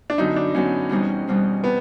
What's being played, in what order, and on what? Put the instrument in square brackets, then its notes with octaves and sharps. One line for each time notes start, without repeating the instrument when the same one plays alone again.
[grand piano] D4
[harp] F#2 D3 F#3 B3 [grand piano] D#4
[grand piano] D4
[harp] F#2 D3 F#3 B3 [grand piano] C#4
[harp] E2 B2 G3 C4 D#4
E2 B2 G3 C4 D#4
[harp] C3 [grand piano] B3